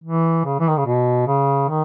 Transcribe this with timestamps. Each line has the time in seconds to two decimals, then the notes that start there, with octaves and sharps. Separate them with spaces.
0.03 E3
0.45 C#3
0.60 E3
0.68 D#3
0.77 C#3
0.86 B2
1.27 C#3
1.69 D#3